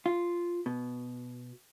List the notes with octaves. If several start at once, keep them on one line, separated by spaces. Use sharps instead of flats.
F4
B2